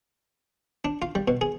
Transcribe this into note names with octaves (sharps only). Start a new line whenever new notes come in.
D4
F4
G3
B2
G#4